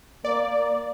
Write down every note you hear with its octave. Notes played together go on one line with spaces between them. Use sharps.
A#3 D5